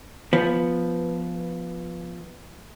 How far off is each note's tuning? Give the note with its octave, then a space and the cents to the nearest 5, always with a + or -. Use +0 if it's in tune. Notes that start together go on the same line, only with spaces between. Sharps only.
F3 +0 B3 +0